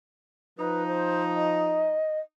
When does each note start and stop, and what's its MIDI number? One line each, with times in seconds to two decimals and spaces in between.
0.57 1.99 53
0.57 1.99 63
0.57 0.85 71
0.87 1.22 72
1.36 2.19 75